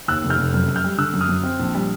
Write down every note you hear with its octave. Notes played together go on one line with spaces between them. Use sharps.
D#2 E6 F#6
F1
F6 G6
F1
F#2
F#2
F6 G6
G3
D3 E6 F#6
F#2
D#6 F6
F#2
C4
A#1
G3